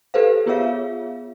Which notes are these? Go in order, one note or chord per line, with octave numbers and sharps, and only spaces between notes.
G4 A4 B4 C5 F5
B3 F4 G#4 C#5 E5 F5